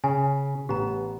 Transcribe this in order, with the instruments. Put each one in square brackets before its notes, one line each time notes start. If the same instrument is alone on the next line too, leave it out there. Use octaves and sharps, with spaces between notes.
[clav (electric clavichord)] C#3 [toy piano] G#5
[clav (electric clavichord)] A1 B3 [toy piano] G4 A#5